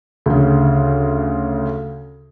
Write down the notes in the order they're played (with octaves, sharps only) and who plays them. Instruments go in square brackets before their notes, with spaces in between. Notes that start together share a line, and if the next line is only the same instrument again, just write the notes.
[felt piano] D2 C#3